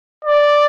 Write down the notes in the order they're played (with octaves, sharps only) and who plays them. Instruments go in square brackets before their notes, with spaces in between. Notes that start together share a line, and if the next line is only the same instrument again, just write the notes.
[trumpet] D5